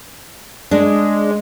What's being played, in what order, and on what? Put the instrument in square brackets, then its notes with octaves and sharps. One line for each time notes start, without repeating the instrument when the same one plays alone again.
[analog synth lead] G#3 [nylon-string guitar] D4 [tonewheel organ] D5 D#5